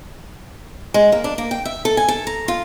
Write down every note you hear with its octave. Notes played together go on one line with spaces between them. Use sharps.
G#3
A#3
D4
A#3
G5
E5
A4
G#5
A4
A#5
F4